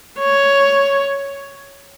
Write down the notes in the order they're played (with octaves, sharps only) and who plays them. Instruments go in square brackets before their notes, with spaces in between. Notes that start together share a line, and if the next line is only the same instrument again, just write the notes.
[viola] C#5